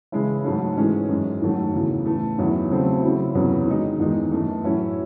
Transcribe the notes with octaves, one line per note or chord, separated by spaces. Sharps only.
C#3 E3 G#3 C#4 E4
G#2 F#3 A3 C#4
G#2 E3 G#3 C#4
F#2 E3 G#3
G#2 D#3 F#3 A3 C#4
E2 C#3 E3
A2 E3 A3
E2 D#3 F#3 C#4 E4
C#3 F#3 A3 C4
C#3 F#3 C#4 E4
E2 C3 F#3 C#4 E4
D#3 G#3 D#4
E2 D#3 G#3 D#4
F#2 E3 A3
A2 F#3 C#4 E4